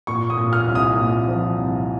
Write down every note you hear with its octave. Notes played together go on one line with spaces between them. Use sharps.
A#2 C#6
D#6
A#2
F6
C2
D#6
A#2
F3
C2